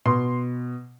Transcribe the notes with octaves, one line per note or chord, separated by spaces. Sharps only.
B2 C6